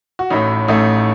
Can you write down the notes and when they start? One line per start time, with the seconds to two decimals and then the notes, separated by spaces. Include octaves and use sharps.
0.19 F#4
0.30 A1 A2 A3 D#4
0.68 A1 A2 A3 D#4